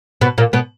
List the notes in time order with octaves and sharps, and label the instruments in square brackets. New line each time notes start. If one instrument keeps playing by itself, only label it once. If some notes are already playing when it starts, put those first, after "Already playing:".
[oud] B2 B3
A#2 A#3
B2 B3